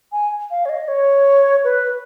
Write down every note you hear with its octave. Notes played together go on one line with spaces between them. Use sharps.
G#5
F5
C#5
D#5
C#5
B4